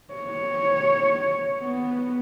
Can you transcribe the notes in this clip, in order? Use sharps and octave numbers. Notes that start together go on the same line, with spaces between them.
C#5
B3